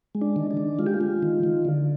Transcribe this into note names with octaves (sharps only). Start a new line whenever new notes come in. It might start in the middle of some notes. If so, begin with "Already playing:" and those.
G#3
D4
D#3
D4
D#3
G#3 F4
G4
F4
G#3
D#3
D#3
D3